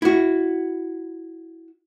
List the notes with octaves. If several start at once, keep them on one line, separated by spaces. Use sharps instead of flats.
E4 F#4